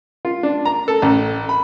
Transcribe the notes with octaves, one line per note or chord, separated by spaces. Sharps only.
F4
D4
A#5
A4
A1
B5